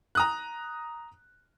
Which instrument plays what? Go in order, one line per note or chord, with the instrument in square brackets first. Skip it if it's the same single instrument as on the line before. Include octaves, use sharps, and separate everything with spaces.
[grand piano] A#5 D#6 F#6